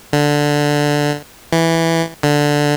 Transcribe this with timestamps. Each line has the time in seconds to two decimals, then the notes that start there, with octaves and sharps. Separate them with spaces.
0.13 D3
1.52 E3
2.23 D3